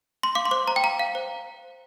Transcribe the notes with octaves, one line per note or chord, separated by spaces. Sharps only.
C6
F5 D6
C6
C5 D6
C5 A#5
G5
F5 A#5
F5
C5